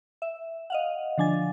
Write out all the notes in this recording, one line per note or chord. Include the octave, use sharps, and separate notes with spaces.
E5
D#5 F5 F#5
D3 F3 D4 G#5 A6